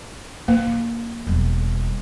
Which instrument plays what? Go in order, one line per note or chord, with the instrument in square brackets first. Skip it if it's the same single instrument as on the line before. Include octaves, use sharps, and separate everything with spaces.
[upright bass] D3 [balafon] A#3
[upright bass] D3
E1 G3